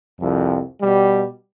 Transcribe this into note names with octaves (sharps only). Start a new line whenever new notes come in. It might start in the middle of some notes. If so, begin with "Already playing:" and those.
C2 F2
B2 G3